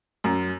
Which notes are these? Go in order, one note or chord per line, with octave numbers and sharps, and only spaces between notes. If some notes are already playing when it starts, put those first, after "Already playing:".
F#2